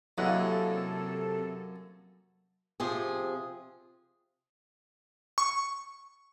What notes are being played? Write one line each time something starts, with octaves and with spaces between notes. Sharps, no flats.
F#2 C3 A#3 E4 A4 D#5 F#5
C3 F3 G#4
C#6